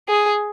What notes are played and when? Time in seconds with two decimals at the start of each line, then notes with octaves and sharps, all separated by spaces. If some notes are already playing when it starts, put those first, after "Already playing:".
0.09 G#4